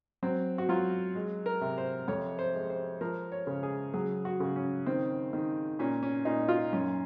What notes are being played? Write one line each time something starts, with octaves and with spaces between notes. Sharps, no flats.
F#3 C4
F#4
F#3 F4
G#3
A#4
C3
C5
F2 C#5
C5
G#3
C5
F3 A#4
C#5
C#3
G#4
F#3 G#4
F#4
C#3
C#4
D#3 C4
D#3
A#2 C#4
C#4
A#2 D#4
F4
F#2 C#4